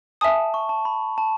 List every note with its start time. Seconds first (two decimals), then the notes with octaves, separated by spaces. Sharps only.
0.21 E5 G#5 A5 D#6
0.54 C#6
0.69 A5
0.85 B5
1.18 A5